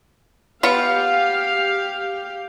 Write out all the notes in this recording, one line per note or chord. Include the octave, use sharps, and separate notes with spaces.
B3 F4 G4 F5